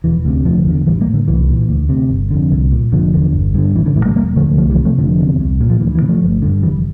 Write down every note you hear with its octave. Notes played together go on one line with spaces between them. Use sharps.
E1 E3
D2 C3
F1 D3 F3
E2 D3
A1 E3 G3
G3 A#3
A2
D3
C2 E3
A#2
D2
C3
G1
F2 D3
C2
A#2
F1 D3 F3
E2 D3
G1
G2 D3
A1 E3
D3
A2 E3
G3 A#3
E1 G3 A#3
D2 D3 F3 A3
C2 F3 A3
E3 G3
C3
F3 A3
F1 D3 F3
E2 C3
C2
A#2
F3
D2 E3
E3
C3
F3 A3
G1
G2 D3
F1 E3 G3